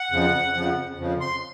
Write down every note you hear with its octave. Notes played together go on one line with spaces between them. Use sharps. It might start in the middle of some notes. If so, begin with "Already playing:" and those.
Already playing: F#5
F2 C#3 F3
F2 C#3 F3
F2 C#3 F3
C6